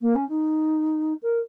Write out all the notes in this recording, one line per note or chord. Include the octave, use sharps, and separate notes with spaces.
A#3
C#4
D#4
A#4